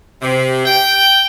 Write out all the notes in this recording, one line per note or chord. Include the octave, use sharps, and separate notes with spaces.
C3
G5